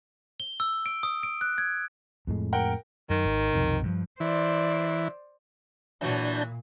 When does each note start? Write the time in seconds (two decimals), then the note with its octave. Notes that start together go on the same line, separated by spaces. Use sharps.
0.40 G7
0.60 E6
0.86 D7
1.03 D#6
1.23 D7
1.41 F#6
1.58 G#6
2.27 F2 A2 G#3
2.53 A#4 F#5 G5
3.10 F#2 D#3
3.24 G#1
3.53 B1 F2 C3
3.84 G2 D#3 F3
4.20 E3 C5 D5
6.01 A#2 E3 F#3 D4 F#4 A5 G6